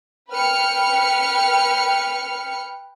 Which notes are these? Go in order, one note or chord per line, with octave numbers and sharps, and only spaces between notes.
B4 G5 F6 C#7